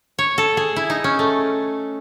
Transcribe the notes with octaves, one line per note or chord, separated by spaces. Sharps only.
C#5
A4
G#4
E4
D#4
C#4
A3